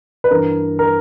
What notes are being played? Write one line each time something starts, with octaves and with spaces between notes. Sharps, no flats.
B4
G2 E3 A#4
A#4